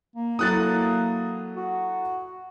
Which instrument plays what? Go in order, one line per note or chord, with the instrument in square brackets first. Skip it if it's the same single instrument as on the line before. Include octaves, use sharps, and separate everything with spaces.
[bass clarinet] A#3
[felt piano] F#3 E4 A4 [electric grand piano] D#6 F#6 A6
[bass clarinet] F#4